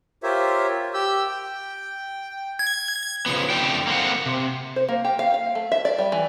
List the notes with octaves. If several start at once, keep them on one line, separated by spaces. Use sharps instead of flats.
F4 G4 A#4 C5 C#5 E5
G4 E6 G6
G5
G#6
C#3 F3 B3
F2 D3 A3 D5 G5
A#3 C4 F#5
C3
C5
A#3
G4
F5
F5
A3
E5
D5
G3
E3